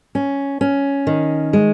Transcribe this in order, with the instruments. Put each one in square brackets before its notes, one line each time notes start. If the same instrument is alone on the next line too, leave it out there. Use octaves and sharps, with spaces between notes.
[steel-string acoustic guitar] C#4
C#4
D#3
G#3